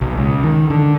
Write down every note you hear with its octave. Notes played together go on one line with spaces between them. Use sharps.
B1
C#2
D#3
D3